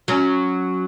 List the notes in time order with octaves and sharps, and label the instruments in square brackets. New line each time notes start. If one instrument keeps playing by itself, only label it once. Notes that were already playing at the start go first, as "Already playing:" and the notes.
[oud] F#3 C#4